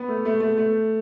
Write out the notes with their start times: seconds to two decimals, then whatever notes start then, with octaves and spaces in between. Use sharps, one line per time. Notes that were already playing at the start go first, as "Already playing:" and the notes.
Already playing: B3
0.08 A3
0.25 A3
0.40 A3
0.58 A3